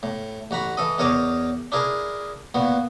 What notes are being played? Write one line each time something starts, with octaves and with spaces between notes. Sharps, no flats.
A2
A1 F#4 A#5 B5
E3 A4 D#5
E2 A#4 C#5 D#5 D6
D4 E4 G#4 A#4
A#2 B3 F#4